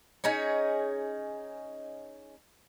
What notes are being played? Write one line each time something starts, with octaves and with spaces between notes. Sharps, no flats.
C#4 D#4 G#4 C#5